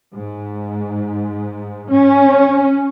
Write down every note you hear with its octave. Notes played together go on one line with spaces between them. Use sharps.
G#2
C#4